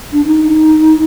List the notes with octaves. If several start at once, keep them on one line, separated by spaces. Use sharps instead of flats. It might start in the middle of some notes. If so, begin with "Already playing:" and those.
D4
D#4